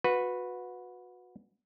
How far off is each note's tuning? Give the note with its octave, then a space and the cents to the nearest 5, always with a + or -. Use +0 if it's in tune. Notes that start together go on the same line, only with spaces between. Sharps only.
F#4 -25 B4 +0